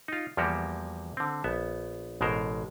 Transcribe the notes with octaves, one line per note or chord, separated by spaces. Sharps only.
D#4 F4
E2 F3 G3 A#3 F#4 G4
D3 C4
A#1 B3 E5
A1 B2 G#3 A#4 C5